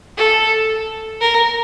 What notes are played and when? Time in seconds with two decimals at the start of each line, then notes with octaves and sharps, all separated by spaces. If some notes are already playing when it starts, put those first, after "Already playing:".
0.17 A4
1.21 A#4